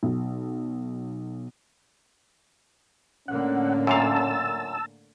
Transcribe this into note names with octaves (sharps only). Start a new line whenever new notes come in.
B1
A2 D3 A#3 C#4 F#5
F#2 A#2 F5 A5 E6